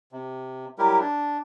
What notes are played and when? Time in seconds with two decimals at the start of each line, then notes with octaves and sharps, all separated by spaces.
0.12 C3
0.78 F#3 G3 E4 G4 A#4
1.00 D4